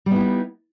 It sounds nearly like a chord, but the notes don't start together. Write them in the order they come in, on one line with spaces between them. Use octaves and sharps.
G3 B3 E4 D#4